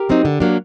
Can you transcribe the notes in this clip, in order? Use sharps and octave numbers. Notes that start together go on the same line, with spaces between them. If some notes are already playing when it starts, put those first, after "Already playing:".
Already playing: G4 A#4
F#3 C4 D#4
D3
F#3 A#3 D4